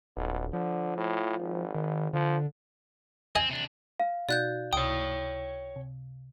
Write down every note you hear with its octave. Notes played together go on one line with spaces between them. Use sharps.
D#1 B1
D3 F3
A2
G#1
D#3
D3 F3
C4 D#5 G#5
C3 D4
F5
B2 D#4 F#4 D5 F#6 G6
C#2 C3 C#5 G5 D#6
C3